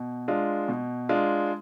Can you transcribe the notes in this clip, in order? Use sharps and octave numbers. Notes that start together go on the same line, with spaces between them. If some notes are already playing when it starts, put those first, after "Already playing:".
Already playing: B2
G#3 D4 F4
B2
G#3 D4 F4